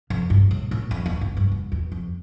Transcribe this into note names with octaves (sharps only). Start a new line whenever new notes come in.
F2
G2
A2
A2
F2
E2
F2
G2
E2
E2
F2